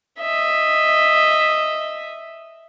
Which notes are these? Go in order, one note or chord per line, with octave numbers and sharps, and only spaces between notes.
D#5 E5